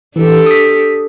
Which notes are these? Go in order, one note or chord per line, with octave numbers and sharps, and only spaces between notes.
E3 D4 G4 A4
D#6 B6